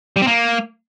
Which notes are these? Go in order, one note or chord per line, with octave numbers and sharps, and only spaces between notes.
G3
C4
A#3